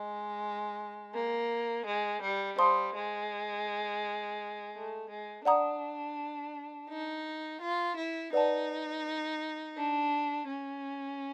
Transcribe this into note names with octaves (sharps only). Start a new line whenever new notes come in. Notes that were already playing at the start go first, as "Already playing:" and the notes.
Already playing: G#3 D#5
A#3
G#3
G3
G3 C5 F5 A5 C6 D#6
G#3
A3
G#3
D4 D5 F#5 A#5 D#6
D#4
F4
E4
D#4 B4 D5 F#5 A5
D4
C#4